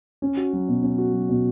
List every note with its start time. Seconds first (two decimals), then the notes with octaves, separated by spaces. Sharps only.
0.22 C#4
0.37 F#4
0.53 F#3
0.68 B2
0.83 C#4
0.98 F#4
1.13 F#3
1.29 B2